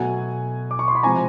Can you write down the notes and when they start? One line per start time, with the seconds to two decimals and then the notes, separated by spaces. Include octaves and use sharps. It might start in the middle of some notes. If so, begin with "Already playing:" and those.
Already playing: B2 F#3 A3 F#5 G#5
0.71 D6
0.79 C#6
0.88 C6
0.95 B5
1.03 C3 F3 G#3 G#5 A#5